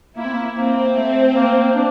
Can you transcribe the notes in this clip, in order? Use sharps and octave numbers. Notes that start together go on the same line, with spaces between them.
A#3 E4
C4
A#3
A#3 C4
A3
A#3
D4